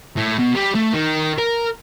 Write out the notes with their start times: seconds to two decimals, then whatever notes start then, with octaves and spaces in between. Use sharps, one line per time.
0.17 A2
0.39 B2
0.55 G3
0.75 A3
0.93 D#3
1.38 A#4